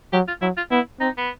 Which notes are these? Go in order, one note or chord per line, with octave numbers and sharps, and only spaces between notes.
F#3 G4
F4
F#3 E4
F4
B3 E4
C4 D#4
B3